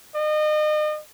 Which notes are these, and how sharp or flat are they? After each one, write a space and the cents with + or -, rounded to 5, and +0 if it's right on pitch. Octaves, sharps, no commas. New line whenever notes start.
D#5 -35